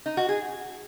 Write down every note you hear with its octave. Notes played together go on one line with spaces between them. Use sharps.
D#4
F#4
G#4